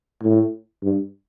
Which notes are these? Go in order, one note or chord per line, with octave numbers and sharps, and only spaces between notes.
A2
G2